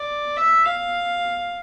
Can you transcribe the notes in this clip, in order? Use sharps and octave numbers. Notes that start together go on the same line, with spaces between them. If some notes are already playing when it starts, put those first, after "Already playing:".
Already playing: D5
E5
F5